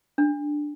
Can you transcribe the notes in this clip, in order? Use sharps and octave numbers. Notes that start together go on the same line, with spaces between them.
D4